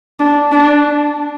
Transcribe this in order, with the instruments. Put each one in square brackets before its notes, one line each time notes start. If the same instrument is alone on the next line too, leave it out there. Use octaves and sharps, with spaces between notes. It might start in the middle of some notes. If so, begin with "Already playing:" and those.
[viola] D4
D4